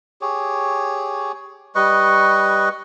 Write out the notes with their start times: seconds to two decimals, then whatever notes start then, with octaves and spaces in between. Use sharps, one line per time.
0.21 G4 G#4 C#5
1.75 G3 B4 D#5 C#6